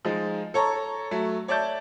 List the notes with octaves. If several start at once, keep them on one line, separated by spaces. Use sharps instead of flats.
F3 G#3 D#4
A4 C#5 A#5 C#6
F#3 A3
C#5 D5 E5 A5 G6